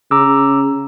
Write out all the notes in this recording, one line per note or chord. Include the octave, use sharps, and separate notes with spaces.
C#3 A#5 D6 E6